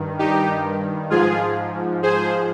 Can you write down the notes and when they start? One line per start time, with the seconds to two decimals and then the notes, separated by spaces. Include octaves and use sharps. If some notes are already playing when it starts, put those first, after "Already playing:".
Already playing: G2 D#3
0.19 D#4 G4
1.10 G#2 F3 F4 G#4
2.03 G#4 C5